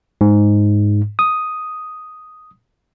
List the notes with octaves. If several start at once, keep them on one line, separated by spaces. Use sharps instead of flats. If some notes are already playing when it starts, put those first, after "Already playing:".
G#2
D#6